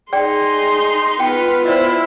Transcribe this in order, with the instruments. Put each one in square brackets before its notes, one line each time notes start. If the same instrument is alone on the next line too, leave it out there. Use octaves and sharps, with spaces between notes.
[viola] D#4 C6 [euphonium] G#4 [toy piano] D5 G5
[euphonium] B3 [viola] F4 B4 [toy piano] G5
[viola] E4 F4 [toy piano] C5 D5 D#5